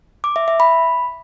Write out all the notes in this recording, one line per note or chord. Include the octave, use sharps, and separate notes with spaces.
D6
E5
E5
B5